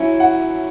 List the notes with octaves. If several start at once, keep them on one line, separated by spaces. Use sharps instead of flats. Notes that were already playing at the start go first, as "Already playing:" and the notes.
Already playing: F#3 C#4 E4 E5
F#5